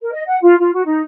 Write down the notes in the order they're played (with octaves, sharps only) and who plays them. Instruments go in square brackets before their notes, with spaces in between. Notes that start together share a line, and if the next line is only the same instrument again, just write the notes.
[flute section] A#4
D#5
F#5
F4
F4
F#4
D#4